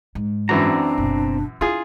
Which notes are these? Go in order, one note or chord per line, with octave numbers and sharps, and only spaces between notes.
G#2
F#2 E3 C4 D4 F#4 D5 A#5
F#1 B2
D4 E4 F4 G#4